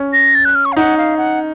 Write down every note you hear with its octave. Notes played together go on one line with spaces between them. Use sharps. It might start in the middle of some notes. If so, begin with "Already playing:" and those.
Already playing: C#4
A#6
A6
F#6
F6
C#6
F5
D#4 F#5
F5
F#5